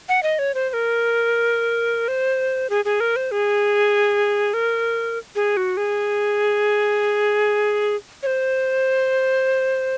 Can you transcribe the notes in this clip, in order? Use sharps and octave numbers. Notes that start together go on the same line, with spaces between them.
F#5
D#5
C#5
C5
C5
A#4
C5
G#4
G#4
A#4
C5
G#4
A#4
G#4
F#4
G#4
C#5
C5